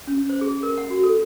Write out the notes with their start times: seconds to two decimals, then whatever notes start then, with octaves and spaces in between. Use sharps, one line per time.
0.07 C#4
0.29 C5
0.41 G#4
0.63 A#4
0.78 F#5
0.90 F#4
1.03 A4